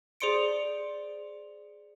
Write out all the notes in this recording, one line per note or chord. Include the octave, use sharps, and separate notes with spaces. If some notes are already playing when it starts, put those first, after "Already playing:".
G#4 C5 D5 C6 C#7 D7